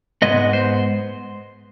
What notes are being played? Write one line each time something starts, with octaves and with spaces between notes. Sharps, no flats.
G#2 D#3 G#3 B3 D#5
C5